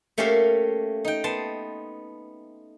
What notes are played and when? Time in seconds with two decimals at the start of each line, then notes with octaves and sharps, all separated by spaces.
0.18 A3 A#3 C#4 G4 E5 F5
1.05 D#4 G5
1.24 B3 A5 C6